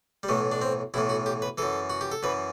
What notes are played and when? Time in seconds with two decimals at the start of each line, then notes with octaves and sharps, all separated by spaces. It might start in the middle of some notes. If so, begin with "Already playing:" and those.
0.23 G3
0.28 B1 A2 E3 A3
0.51 D4
0.62 C4
0.94 B1 A2 E3 E4
1.09 F#4
1.26 G4
1.42 B4
1.58 F#2 E3 A4
1.90 F#4
2.01 G4
2.12 A4
2.23 F#2 E3 B4